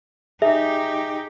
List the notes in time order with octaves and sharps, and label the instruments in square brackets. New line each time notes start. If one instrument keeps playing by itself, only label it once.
[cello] D#4 G4 [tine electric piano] G#4 [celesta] E5